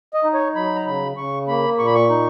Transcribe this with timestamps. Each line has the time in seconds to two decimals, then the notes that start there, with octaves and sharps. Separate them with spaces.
0.14 D#5
0.24 D#4
0.34 C#5
0.55 F#3 B5
0.75 A#5
0.86 C#3 B5
1.17 C#3 C#6
1.48 A#3 B5
1.79 A#2 C#6
1.87 B5
1.94 C#6
2.09 D#4